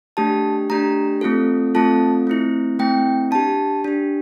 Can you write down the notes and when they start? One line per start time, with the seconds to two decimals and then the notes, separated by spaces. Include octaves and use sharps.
0.17 A3 D4 G4 A5
0.70 A3 D4 G4 A#5
1.21 A3 C4 F4 A4
1.75 A3 C4 F4 A4 A5
2.27 A3 C4 E4
2.79 A3 C4 E4 G5
3.31 D4 G4 A5
3.84 D4 G4